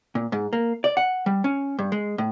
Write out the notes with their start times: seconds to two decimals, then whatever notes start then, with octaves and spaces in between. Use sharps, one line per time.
0.15 A#2
0.32 G#2
0.53 A#3
0.84 D5
0.97 F#5
1.26 G3
1.44 C#4
1.79 G2
1.92 G#3
2.18 A2